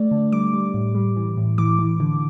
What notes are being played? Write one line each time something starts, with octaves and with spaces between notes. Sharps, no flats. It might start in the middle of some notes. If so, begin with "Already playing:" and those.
Already playing: A3 D5
D3
G3 D6
G3
A2
G3
E3
A2
E3 D6
E3
D3